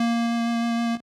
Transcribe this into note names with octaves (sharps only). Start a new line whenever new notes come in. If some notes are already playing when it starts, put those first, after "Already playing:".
Already playing: A#3